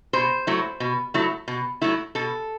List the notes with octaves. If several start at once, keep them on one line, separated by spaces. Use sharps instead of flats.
B2 C5
F#3 A3 E4
B2
F#3 A3 E4
B2
F#3 A3 E4
B2 A4